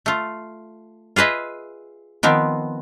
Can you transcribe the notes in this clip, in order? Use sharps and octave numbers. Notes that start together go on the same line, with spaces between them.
A3 F4
F4 G#4 B4 D#5 E5
D#3 F3 B3 C4